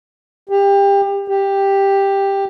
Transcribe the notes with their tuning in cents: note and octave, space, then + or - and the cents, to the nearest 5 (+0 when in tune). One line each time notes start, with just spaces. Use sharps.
G4 +25
G4 +5